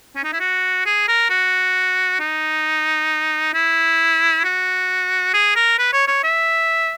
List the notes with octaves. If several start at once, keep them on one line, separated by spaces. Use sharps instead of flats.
C#4
D#4
E4
F#4
G#4
A#4
F#4
D#4
E4
F#4
G#4
A#4
B4
C#5
C#5
E5